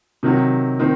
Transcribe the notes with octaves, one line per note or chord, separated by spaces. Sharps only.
C3 D#3 F#3
D#3 C4